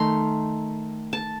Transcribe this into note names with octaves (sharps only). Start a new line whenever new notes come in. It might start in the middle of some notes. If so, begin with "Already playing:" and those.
Already playing: D#3 A3 A#5 C6
A5